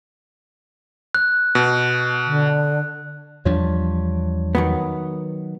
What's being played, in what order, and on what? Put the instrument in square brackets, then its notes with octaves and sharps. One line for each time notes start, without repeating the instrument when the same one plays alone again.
[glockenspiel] F#6
[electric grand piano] B2
[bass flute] D3
[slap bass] E2 F3 G3 [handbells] D4 F4 C#5
[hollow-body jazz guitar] D#3 F#3 B3 [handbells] D#6